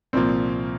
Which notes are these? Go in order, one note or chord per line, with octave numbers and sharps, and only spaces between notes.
C2 A#2 F3 A#3 C4